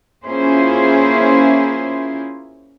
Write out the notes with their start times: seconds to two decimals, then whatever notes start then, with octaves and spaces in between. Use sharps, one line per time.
0.25 A#3 C#4 E4 F4 G#4 C5